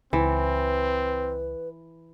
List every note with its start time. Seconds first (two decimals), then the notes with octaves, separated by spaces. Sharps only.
0.13 C#2 E3 C4 B4